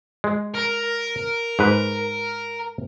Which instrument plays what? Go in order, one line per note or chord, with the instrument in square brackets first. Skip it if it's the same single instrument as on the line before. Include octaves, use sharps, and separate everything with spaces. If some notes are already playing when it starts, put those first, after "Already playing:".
[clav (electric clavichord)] G#3
[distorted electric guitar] A#4
[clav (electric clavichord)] G#2 B4